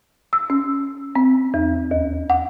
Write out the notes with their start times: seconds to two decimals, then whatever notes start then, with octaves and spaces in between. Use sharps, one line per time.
0.33 E6
0.50 C#4
1.15 C4
1.54 E2
1.91 D#2
2.30 F#5